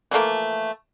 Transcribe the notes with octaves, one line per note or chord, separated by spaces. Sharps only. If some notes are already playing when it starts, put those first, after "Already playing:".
E3 F3 A3 A#3